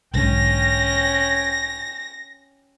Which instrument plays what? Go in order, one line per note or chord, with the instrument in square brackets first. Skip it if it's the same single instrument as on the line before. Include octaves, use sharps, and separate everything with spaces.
[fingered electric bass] B1 G#2 D3 [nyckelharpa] C#4 G5 [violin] A#6